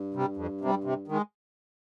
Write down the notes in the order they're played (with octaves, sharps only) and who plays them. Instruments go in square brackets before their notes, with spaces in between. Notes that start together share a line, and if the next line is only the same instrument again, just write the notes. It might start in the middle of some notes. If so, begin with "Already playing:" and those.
Already playing: [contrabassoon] G2
[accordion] C3 G3
F2
C3 G3
C3
D#3 G#3